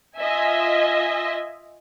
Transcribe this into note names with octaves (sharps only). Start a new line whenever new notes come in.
F4 D#5 E5 G#5